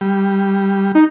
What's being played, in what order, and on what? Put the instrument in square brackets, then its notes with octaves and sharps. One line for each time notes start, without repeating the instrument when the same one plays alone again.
[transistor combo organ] G3
[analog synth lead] D#4